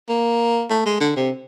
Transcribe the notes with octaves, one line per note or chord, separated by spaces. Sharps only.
A#3
A3
G#3
D3
C3